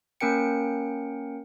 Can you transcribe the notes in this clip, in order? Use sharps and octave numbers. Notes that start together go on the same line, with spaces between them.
A#3 C#4 A#4 G5 C#7